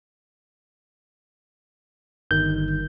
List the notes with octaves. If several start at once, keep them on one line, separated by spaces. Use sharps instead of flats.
G1 D#3 G6